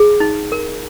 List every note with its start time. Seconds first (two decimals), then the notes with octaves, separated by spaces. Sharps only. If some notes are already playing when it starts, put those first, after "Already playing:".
Already playing: G#4
0.20 D#4
0.52 A#4